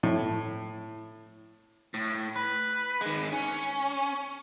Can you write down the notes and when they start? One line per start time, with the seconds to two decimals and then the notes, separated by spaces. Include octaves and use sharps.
0.03 A2
1.94 A2
2.36 B4
3.01 D#3 G#3
3.33 C#4